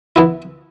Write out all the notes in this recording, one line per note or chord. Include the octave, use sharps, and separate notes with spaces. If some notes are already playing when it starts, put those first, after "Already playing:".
E3 B3 E4